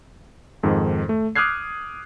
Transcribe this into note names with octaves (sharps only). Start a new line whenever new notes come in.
F2 G#2 D#3
A3
D6 D#6 F6 F#6 G#6 C7